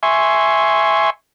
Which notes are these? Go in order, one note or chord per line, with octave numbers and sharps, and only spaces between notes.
E5 G#5 C6 C#6